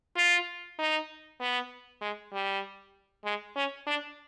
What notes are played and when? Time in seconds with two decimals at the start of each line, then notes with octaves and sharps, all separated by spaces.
0.17 F4
0.79 D#4
1.40 B3
2.01 G#3
2.33 G3
3.25 G#3
3.56 C#4
3.87 D4